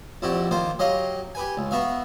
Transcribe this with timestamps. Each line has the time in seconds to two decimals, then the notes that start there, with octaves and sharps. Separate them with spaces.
0.22 A#1 F2 E4 F#4 G4
0.51 D#3 A#3 F4 C5
0.79 F#3 G4 D#5 F5
1.35 G4 B4 G#5
1.57 C#2
1.71 B3 F#4 E5 F5